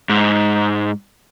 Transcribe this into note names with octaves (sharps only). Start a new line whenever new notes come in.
G#2